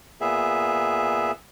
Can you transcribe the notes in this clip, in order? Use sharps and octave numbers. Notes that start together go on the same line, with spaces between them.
A#2 B3 G#4 E5